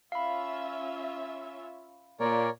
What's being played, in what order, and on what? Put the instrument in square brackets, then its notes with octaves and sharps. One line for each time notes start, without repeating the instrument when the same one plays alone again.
[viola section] C#4 F4 E5 [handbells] F5 B5
[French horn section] A#2 [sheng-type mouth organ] A#4 C#5 D5